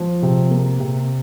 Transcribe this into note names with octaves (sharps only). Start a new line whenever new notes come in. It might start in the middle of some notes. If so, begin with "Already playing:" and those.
Already playing: F3
C3
A#3
C3